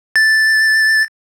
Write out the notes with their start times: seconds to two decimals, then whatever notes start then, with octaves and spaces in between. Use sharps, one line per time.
0.16 A6